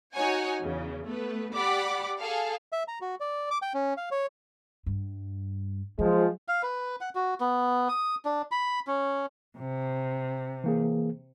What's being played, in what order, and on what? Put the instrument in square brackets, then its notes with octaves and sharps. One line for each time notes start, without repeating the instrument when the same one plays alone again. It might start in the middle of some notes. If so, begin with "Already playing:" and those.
[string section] D#4 F#4 C#5 F#5 G#5
E2 C#3
A3 B3 B4
G4 D5 F#5 B5 D6
G#4 A4 F5
[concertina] E5
A#5
F#4
D5
D6
G5
C#4
F5
C#5
[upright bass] G2
[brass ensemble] F3 G#3 [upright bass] F#3
[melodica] F5
B4
F#5
F#4
B3
D#6
D4
B5
C#4
[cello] C3
[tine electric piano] E3 A#3 G#4